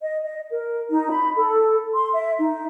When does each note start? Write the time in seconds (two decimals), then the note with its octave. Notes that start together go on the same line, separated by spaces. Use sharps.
0.01 D#5
0.24 D#5
0.50 A#4
0.89 D#4
1.09 B5
1.35 A4
1.93 C6
2.13 E5
2.38 D#4